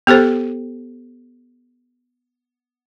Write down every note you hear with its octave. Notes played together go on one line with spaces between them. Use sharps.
B3 G4 A4 C5